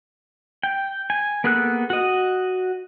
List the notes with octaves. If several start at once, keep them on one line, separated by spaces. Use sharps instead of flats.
G5
G#5
A#3 B3 G#4 A4 F#6
F#4 D#5